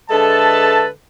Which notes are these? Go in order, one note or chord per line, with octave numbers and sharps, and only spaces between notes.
D3 G#3 A4 B4 E5 A5